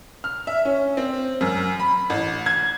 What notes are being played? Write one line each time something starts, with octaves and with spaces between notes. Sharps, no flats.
F6
E5
C#4
C4
F#2
B5
A1
G#6